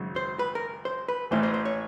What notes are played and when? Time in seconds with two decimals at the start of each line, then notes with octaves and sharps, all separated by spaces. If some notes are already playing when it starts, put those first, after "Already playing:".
Already playing: G#1 F#2 C#3
0.16 C5
0.39 B4
0.55 A#4
0.85 C5
1.08 B4
1.31 A1 A2 E3 C5
1.43 C5
1.54 C5
1.65 C#5